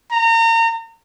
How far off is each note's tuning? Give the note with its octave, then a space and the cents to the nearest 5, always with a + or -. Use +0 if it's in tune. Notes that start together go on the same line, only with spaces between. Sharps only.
A#5 -30